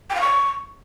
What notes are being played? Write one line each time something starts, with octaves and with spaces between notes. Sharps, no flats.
G5
F5
C#6